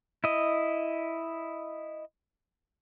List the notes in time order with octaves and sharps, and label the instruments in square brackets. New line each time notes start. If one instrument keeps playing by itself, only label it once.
[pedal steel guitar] E4 D#5